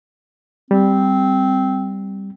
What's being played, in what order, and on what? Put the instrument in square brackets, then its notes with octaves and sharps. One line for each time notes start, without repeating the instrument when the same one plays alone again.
[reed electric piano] G3 [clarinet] C4